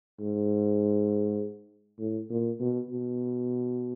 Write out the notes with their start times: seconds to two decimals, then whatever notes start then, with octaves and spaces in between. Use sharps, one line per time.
0.20 G#2
1.99 A2
2.30 A#2
2.60 B2
2.90 B2